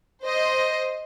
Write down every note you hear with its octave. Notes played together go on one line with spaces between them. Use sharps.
C5 D#5